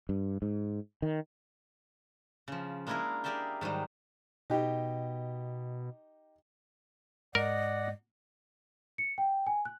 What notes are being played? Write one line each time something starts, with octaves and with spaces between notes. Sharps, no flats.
G2
G#2
D#3
C#3 F3
G#3 A#3 D4 E4 G#4 A#4
G4 G#4 A#4 D5 E5 G5
G#2 D#3 F#3 G3
B2 D#4 G4
G#2 A#4 D5 D#5 F#5
C#7
G5
G#5
F#6